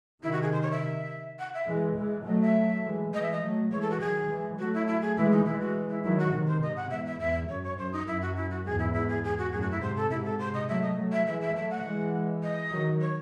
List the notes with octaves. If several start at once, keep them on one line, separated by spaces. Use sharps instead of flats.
C3 D#3 E4
F#4
G#4
C5
C#5
E5
F#5
E5
E3 G#3
E3 G#3
F#3 A3 D#5
E5
E3 G#3
E3 G#3 D#5
E5
D#5
F#3 A3
E3 G#3 C#5
A4
F#4
D#3 F#3 G#4
E3 G#3
F#3 A3 F#4
E4
E4
G#4
E3 G#3 E4
D#4
E3 G#3 E4
F#4
E4
D#3 F#3 E4
F#4
C3 D#3
C5
G#2 C3 D#5
F#5
E2 G#2 E5
E5
E2 E5
F#2 C#5
C#5
F#2 C5
D#4
F#2 E4
F#4
E4
F#4
E2 G#2 G#4
E4
E4
G#4
G#4
F#4
F#2 A2 G#4
F#4
E4
G#2 C3 C5
A4
G#2 C3 E4
A4
C5
D#5
F#3 A3 E5
D#5
F#3 A3
E5
E3 G#3 E5
E5
F#3 A3 E5
F#5
E3 G#3
D#5
D#3 F#3
C#5